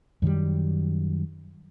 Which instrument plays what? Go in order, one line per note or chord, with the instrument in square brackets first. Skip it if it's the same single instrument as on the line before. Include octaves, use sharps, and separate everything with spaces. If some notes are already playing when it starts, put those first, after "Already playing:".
[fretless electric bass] F#2 D#3 F#3 G3